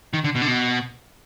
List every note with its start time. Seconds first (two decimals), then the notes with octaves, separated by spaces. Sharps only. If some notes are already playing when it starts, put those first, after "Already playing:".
0.13 D#3
0.24 D3
0.35 B2
0.42 D3
0.48 B2